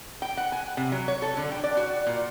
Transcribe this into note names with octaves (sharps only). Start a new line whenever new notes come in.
G5
F#5
G#5
C3
F#3
C#5
A4
D3
G5
D5
F#4
A#2